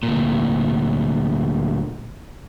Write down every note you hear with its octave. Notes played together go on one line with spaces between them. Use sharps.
D2 A#2